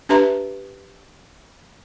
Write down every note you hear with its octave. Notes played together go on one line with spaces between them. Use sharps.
D4 G4 B4 E5 A#5 C6